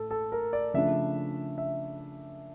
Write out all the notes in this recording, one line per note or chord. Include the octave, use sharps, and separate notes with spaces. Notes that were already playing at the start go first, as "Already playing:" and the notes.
Already playing: A2 A4
A4
A#4
D5
C#3 F3 A3 D4 E5
E5